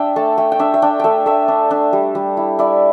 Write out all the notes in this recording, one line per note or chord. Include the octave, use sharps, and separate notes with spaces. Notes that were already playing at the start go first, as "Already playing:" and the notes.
Already playing: D4 D5 E5 G5
A3 A5
A3 G5
G5
D4 E5
E5
D4 G5
A3 E5 G5
A3 E5
D4
D4
G3
G3
E4
E4 D5